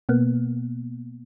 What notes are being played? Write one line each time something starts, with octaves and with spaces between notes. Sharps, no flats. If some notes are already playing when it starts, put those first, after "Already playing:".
B2 A#3 B3